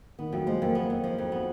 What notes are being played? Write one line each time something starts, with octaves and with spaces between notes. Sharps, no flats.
D#3 B3
F2 F#3
F3 G#3
F2 A#3
A#3 B3
F2
F3
F2
B3